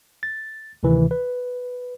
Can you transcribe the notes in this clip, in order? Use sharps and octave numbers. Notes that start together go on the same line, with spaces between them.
A6
D2 C3 D#3 E3
B4